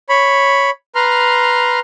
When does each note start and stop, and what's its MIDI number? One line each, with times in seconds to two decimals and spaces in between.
0.09 0.70 73
0.09 0.70 83
0.95 1.80 71
0.95 1.80 82
0.95 1.80 84
0.95 1.80 89